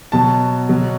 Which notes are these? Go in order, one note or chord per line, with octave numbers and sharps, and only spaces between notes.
B2 F#3 A5
B2 F#3